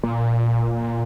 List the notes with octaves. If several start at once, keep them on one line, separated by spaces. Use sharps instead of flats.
A#2